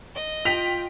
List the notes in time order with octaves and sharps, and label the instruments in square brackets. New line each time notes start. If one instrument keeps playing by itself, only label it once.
[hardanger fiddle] D#5
[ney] F4 [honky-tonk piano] G5 F7 [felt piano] B6